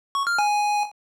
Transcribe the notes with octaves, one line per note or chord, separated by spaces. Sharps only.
C#6
F6
G#5